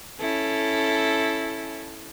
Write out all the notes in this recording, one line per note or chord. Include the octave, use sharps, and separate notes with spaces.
C#4 E4 A4